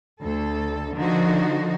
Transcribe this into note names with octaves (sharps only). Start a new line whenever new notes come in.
D2 A4
D3 D#3 F3 D#4 F#4